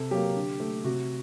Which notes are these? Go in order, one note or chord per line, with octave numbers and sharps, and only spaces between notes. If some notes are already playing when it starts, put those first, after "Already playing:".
Already playing: C3 A4
F#3 A#3 G4
D3
A3
C3 F#4